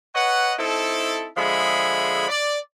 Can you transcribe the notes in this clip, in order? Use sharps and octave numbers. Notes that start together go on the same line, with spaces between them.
B4 C#5 D#5 F#5
C4 D#4 E4 A4
D3 F3 G#3 G#4 E5 B5
D5